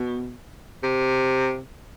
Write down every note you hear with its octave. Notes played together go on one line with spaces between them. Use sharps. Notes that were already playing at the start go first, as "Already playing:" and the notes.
Already playing: B2
C3